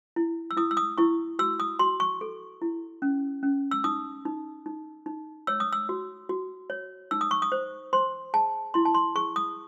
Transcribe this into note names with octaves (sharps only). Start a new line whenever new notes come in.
E4
E6
E4 D#6
E6
D#6
E4 C#6
F#4 E6
D#6
F#4 C6
C#6
A4
E4
C#4
C#4
E6
D#4 D#6
D#4
D#4
D#4
C#5 E6
D#6
E6
F#4
F#4
C#5
D#4 E6
D#6
C#6
D#6
C5
C5 C6
G#4 A5
E4 C6
A5
C6
G#4 C#6
D#6